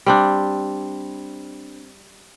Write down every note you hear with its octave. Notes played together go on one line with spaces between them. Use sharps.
G3 C4 D4